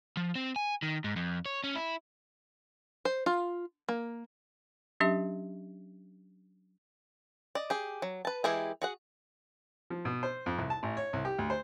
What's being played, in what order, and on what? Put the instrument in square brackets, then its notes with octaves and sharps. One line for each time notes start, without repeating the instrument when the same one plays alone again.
[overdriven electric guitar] F3
C4
G#5
D#3
G#2
F2
C#5
C#4
E4
[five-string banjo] C5
F4
A#3
[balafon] F#3 C#4 D4 G4 E5
[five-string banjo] D5 D#5
G4 G#4
F#3
B4 A5
E3 G#3 E4 G4 G#4
F#4 G#4 F#5
[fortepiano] F3
B2
C5
F2
C2
A5
A1
C#5
C2
G4
D2
C5